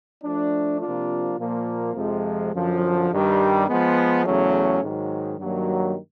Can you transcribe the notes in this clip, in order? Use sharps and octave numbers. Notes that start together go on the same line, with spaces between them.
F3 A3 D4
C3 F3 A#3 D4 F4
A#2 F3 A#3
F2 C3 F3 G#3
F#2 D3 F3
G2 D#3 G3
F3 G#3 B3
E2 C#3 F#3 A3 C#4
G#2 D#3 F#3
G2 D#3 F#3 A#3